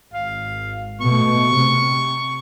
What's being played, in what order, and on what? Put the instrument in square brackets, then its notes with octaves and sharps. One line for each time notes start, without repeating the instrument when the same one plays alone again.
[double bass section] G#1 [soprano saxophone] F5
[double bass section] B2 A3 [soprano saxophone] C#6
[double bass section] C3